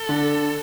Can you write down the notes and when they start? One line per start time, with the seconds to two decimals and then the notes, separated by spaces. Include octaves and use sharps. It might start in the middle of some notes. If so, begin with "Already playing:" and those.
Already playing: A4
0.09 D3